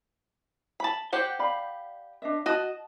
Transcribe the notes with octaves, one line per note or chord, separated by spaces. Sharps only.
A5 B5
G4 C5 F#5
D5 F5 B5
D4 D#5 E5
F#4 D#5 A5